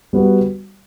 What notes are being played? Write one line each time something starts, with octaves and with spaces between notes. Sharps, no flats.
G3 B3 F#4